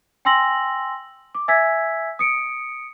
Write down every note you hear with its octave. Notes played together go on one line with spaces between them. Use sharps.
G5 G#5 C6 E6 A#6 F#7
D6
E5 G#5 E6 G#6 B6
D#6 C#7 D7